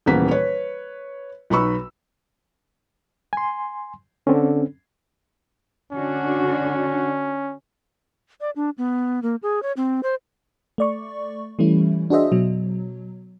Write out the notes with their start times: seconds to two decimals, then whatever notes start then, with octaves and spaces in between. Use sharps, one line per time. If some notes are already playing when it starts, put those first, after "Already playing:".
0.06 D#1 C#3 E3 A#3 B3 B6
0.31 B4 C#5
1.50 B1 D#4 B4 B5 C#6 E6
3.33 G#5 C6
4.27 D3 C4 C#4
5.93 D3 C#4 D4 F#4
8.41 D5
8.56 D4
8.78 B3
9.22 A#3
9.43 G#4
9.63 C#5
9.77 C4
10.03 C5
10.78 A3 D5 C#6
11.59 E3 G3 A3 C#4 E4
12.10 D4 F#4 G#4 C5 D#5 E5
12.32 B2 F#3